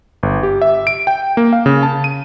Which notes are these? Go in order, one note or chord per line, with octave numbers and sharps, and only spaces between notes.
G1
G4
E5
D7
G5
A#3
F5
C#3
A5
D#7